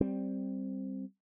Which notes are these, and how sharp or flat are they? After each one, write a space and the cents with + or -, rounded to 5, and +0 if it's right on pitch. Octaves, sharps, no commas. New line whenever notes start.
G3 +0 C4 +5